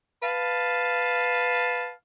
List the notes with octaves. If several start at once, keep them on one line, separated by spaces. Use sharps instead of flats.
B4 F5 A5